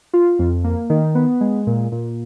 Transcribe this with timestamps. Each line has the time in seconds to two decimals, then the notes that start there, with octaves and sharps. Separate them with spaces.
0.13 F4
0.39 F2
0.64 A#3
0.90 D#3
1.15 B3
1.41 G#3
1.67 A#2
1.92 A#2